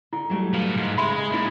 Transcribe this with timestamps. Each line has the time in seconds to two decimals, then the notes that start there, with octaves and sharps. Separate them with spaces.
0.13 D3 E4
0.30 F#3 G3 A3
0.54 B4 F5
0.76 G#2
0.98 C#3 G#3 E5 B5 C6
1.32 A#2 C#4 E4